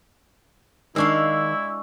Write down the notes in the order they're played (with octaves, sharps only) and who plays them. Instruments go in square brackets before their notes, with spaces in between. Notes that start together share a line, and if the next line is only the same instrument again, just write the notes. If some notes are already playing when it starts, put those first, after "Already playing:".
[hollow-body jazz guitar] D#3 [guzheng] G#3 D4 F5 [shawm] E4 [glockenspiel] C#6 E6